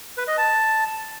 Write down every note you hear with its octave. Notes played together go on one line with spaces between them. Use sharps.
B4
D#5
A5